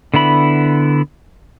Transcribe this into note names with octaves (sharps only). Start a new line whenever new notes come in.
D3 B3 E4 B5